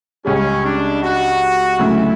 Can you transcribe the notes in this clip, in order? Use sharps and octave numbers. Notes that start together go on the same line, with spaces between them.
C#2 C#3 G3 C#4
D4
F#4
D2 C#3 F#3 C#4 E4